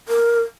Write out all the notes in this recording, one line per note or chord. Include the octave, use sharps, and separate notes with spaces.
A#4